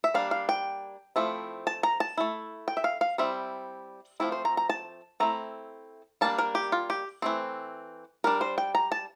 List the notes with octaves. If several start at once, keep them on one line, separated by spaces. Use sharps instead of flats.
E5
G3 A#3 D4 F5
F5
G5
F3 A3 C4 E4
A5
A#5
A5
A3 E4
G5
E5
F5
F5
G3 C4 E4 E5
F3 A3 C4 E4
C5
A#5
A#5
A5
A3 C4 E4 A#5
G3 A#3 D4 A5
A#4
G4
F4
G4
E3 A3 C4
G3 D4 A#4
C5
G5
A#5
A5